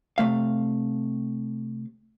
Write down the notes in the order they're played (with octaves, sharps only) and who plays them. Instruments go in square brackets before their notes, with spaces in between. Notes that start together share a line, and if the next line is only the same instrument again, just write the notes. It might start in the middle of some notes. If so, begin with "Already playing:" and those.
[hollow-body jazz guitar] C3 E3 A3 F5